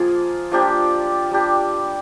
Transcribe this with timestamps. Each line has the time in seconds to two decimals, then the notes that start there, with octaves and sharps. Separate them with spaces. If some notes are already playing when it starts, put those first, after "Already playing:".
Already playing: F3 A#3 F4 G#4
0.52 F3 A#3 D4 G4
1.31 G3 D4 G4